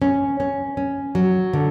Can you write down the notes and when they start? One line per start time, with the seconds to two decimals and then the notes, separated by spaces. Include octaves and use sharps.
0.02 C#4
0.40 C#4
0.77 C#4
1.15 F#3
1.53 D3